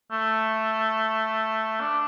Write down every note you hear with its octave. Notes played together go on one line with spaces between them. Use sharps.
A3
D4